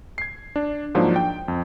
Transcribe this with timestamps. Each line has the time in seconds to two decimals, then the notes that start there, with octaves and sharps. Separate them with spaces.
0.18 G#6 C7
0.56 D4
0.95 G#2 F3 F#3 A#3 D4
1.16 G5
1.48 F2